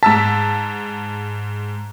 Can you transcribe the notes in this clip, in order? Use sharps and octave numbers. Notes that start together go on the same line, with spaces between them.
G#2 A5 E6 B6